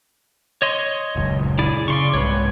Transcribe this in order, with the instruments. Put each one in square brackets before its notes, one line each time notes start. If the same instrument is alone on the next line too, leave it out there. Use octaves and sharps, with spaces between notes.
[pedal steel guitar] C#5 D#5 C6
[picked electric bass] D#1 C#2 F#2
[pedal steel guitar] E4 G#4 D5
[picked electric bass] C#3 [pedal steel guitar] D5 C6 C#6
[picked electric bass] C2 G#2 [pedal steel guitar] B4 C#5